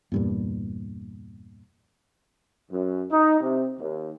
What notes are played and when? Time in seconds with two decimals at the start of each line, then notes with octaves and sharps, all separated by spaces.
0.12 E2 G2 A#2
2.72 F#2
3.11 D#4
3.41 C3
3.80 D#2